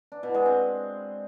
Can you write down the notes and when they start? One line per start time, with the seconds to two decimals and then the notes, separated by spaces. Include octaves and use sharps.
0.12 D4
0.23 B2
0.34 G#3
0.46 C4